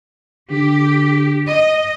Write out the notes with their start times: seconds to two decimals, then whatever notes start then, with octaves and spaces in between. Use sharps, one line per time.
0.51 D3 G4
1.47 D#5